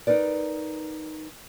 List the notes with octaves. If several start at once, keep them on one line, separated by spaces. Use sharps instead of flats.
D#4 A#4 B4 D5